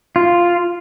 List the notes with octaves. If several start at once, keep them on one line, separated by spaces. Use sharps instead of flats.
F4